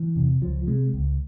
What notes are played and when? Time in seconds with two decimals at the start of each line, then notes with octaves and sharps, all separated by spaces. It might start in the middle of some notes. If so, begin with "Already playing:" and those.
Already playing: E3
0.16 E2 C3
0.41 C#2 F3
0.67 C3 G#3
0.94 C#2